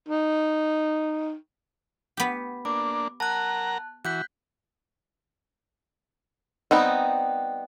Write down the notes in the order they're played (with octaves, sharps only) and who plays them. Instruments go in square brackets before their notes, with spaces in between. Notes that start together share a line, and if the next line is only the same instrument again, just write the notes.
[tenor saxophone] D#4
[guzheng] B3 G4
[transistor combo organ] A#3 D4 [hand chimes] D6
[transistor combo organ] A#4 F#5 A#5 [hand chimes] A5 F#6
[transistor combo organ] E3 F#4 [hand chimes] F#6 G6 B6
[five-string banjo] G3 B3 C4 D#4